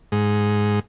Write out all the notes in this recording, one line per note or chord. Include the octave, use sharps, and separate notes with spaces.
G#2